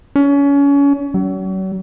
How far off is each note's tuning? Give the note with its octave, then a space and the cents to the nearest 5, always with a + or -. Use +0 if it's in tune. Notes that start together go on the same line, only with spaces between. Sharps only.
C#4 +30
F#3 +40